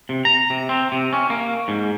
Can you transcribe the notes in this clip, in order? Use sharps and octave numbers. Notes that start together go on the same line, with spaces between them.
C3
A#5
C3
C4
C3
C#4
A#3
G#2